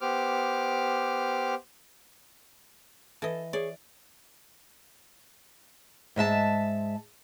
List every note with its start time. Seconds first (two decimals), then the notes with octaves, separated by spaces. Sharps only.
0.01 B3 G4 C5 D6 F6
3.22 E3 A4 D#5
3.53 G#4 C#5 D5
6.16 G#2 G#3 E5 A5